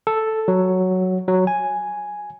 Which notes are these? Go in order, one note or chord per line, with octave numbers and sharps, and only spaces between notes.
A4
F#3
F#3
G#5